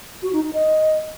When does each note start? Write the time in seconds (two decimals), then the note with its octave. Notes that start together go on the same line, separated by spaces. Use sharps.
0.22 F#4
0.33 D#4
0.43 D#4
0.53 D#5